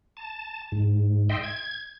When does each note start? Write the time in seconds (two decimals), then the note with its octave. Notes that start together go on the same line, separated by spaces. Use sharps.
0.17 A5
0.72 G#2
1.29 D#5 E5 G5 C6
1.43 G#6